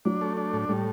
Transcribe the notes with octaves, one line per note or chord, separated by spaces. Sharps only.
F#3 D4
A3
D4
A2
A2 G3